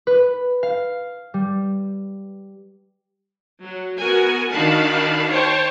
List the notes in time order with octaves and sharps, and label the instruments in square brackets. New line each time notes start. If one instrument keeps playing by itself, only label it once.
[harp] B4
F5
G3
[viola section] F#3
B3 F#4 A#4 G#5
D#3 D4 F#4 F5 A5 B5
C5 C#5 G5 A5